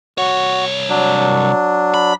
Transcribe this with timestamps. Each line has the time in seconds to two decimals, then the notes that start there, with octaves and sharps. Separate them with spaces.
0.18 C2 F#4 C#5
0.90 F#3 D4
1.94 B5